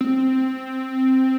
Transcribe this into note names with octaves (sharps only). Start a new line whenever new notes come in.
C4